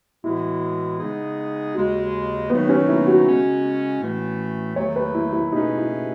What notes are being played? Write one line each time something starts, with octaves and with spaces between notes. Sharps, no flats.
A2 E3 G#3 B3 E4 F#4
C#3 G#3 B3 D#4 G#4
D#2 C#3 G#3 F#4
D#3 F#3 A3 B3 D#4
B3
C#4
E4
F#4
C#3 G#3 C#4
A2 E3 A3 C#4
E2 D#3 F#3 A3 C#5
B4
E4
E4
B2 A3 C#4 D#4 G#4 B4
E4